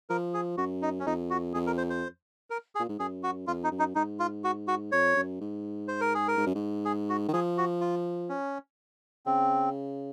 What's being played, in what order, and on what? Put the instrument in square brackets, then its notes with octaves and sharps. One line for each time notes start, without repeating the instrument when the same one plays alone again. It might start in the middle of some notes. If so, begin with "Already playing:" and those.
[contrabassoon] F3 [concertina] A#4
[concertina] G#4
[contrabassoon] F#2 [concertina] F#4
[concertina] D#4
C#4
[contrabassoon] F2 [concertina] D#4
[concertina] F#4
[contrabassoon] F2 [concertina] G#4
[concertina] A#4
C5
C5
A#4
G#4
[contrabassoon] A#2
G#2
[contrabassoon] F#2 [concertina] G#4
[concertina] F#4
[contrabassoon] F2 [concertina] F4
[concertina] D#4
[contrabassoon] F#2
[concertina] D#4
[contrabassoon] G#2 [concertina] D#4
[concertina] F4
F#4
F#4
[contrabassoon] F2 [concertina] C#5
[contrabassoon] F#2
G#2
[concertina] C5
A#4
G#4
A#4
[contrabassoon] G#2
F#2
G#2
[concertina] G#4
F#4
[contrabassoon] D#3
[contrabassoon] F3 [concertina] G#4
[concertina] F#4
F4
C#4
[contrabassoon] C#3 [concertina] C4